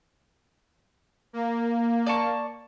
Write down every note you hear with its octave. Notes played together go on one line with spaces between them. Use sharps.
A#3
D5 A5 C#6